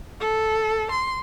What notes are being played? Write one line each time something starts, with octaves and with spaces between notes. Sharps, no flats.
A4
C6